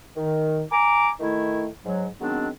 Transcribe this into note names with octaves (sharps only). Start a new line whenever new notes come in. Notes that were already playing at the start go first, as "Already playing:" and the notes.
D#3
G#5 A#5 D6
D#3 A3 E4
G#2 F#3
D#3 F#3 G#3 B3 C4 D4